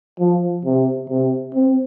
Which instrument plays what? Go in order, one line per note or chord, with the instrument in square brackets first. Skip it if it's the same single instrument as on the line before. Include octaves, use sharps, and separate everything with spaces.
[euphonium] F3
C3
C3
C4